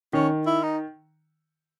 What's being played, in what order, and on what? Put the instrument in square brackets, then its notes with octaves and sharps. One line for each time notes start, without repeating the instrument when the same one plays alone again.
[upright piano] D#3 [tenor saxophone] C#4
[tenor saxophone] E4
D#4